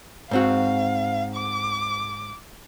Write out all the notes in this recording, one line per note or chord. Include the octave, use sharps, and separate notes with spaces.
G#2 C4 F#4 F5
D6